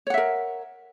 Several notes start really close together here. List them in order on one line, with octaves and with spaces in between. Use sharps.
C#5 F#5 E5 A#4